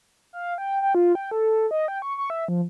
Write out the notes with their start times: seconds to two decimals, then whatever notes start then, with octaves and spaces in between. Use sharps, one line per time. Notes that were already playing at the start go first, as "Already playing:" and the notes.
0.33 F5
0.58 G5
0.82 G5
0.95 F4
1.15 G5
1.31 A4
1.71 D#5
1.88 G5
2.02 C#6
2.18 C#6
2.30 E5
2.48 F3